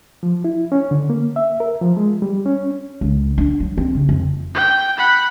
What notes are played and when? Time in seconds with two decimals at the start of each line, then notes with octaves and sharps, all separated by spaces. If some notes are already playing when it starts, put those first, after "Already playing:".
0.23 F3
0.44 E4
0.72 C#4
0.91 D3
1.10 A#3
1.36 E5
1.60 A#4
1.81 F3
1.97 G#3
2.22 G3
2.46 C#4
3.01 C#2
3.38 D4
3.60 F#3
3.78 C4
3.95 C#3
4.09 F2
4.55 G5
4.97 F#5 B5